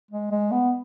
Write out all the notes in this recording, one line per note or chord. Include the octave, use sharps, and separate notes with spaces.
G#3
G#3
B3